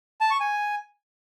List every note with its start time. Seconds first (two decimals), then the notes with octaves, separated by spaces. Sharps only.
0.21 A5
0.31 C#6
0.40 G#5